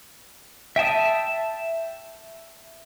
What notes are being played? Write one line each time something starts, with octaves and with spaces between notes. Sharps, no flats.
E5 G5 A5 D#6